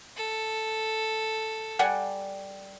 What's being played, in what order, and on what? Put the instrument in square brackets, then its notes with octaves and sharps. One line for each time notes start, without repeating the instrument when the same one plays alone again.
[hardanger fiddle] A4
[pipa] G3 F#5 G#5